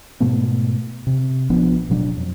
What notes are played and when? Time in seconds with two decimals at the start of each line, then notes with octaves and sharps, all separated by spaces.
0.20 G#2 B2 A3 B3
1.07 C3
1.50 A#1 F3 B3 D4
1.89 D1 B2 F#3 D4
2.17 F2